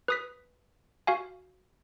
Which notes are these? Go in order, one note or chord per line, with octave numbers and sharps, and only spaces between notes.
B4 D#6 B6
F#4 F5 G#5